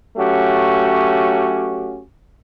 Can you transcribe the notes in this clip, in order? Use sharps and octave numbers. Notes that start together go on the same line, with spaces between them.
F#3 A3 C#4 F#4 G4